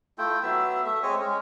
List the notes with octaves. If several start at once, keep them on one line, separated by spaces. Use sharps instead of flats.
A3 E4 F4 G5
F#3 B3 E5 E6
A3 E5
G#3 C4 C#5 D#5
G#3 C#4